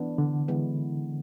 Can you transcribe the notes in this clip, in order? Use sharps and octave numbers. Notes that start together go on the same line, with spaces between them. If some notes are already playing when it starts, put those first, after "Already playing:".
Already playing: E3 B3 D4
D3
E3 G#3 B3